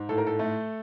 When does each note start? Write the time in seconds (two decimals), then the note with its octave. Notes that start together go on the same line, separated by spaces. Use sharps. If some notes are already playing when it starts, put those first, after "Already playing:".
Already playing: G#2
0.09 A2 A4
0.18 A#4
0.27 A4
0.39 A3